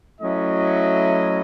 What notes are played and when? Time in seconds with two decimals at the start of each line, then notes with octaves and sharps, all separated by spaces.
0.21 F#3 A3 C#4 E4 D#5